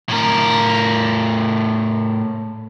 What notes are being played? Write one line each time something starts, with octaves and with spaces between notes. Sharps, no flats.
A2 A#4